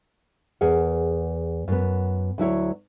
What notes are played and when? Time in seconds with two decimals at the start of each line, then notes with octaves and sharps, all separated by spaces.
0.61 E2 G#4 A#4 F#5
1.68 F#2 B3
2.38 D2 F#3 E4 C#5